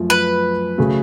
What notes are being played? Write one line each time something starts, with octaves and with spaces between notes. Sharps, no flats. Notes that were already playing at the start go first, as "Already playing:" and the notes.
Already playing: F#2 F3 A3
B4
C#3 F#3 A3